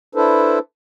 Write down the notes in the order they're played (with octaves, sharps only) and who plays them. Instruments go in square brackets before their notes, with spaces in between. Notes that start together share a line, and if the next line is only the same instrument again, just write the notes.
[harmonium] D4 E4 A4 B4 C5